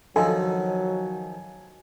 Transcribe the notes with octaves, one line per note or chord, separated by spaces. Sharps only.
D#3 F3 F#3 D#4 A4 D#5 G#5